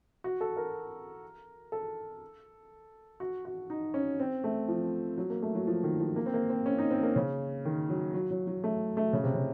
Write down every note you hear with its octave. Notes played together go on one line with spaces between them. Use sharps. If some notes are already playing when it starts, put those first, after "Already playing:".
F#4
A4
A#4
A4
F#4
F#4
D#4
C#4
C4
A3
F3
F#3
A#3
A3
F#3
F3
D#3
F3
A#3
C4
A#3
C4
C#4
D#4
C4
A#3
C#3
D#3
F#3
F#3
F#3
F#3
A3
A3
C#3
C3
C#3